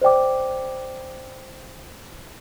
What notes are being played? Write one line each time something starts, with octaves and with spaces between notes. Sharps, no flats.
C5 D5 G5 D6